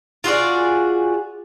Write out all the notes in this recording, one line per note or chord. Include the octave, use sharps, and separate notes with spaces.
F4 F#4 G#4 D5